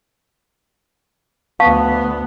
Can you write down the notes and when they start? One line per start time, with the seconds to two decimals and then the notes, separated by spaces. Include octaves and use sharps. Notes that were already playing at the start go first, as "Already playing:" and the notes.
1.60 D2 B3 F5 A5 C#6